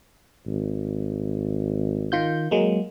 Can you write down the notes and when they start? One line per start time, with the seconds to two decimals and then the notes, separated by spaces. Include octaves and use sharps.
0.46 G#1
2.12 D#3 F4 G6
2.51 F#3 G#3 A#3